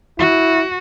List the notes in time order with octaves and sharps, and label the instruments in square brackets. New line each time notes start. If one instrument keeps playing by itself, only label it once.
[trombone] E4 [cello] F#4